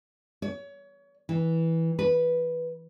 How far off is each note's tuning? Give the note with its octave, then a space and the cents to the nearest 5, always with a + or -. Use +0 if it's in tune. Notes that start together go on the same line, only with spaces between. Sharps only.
C#5 +30
E3 -10
B4 -10